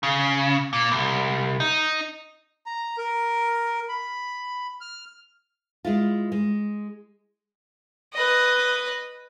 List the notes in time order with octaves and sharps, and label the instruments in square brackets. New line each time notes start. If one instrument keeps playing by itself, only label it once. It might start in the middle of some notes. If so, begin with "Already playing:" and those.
[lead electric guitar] C#3
A#2
C2
D#4
[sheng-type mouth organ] A#5
A#4
B5
F6
[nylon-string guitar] G#3 E4 F4
G#3
[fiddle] B4 D#5